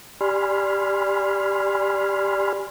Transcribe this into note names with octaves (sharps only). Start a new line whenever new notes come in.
G4 D5 G#5 B5 C6 F6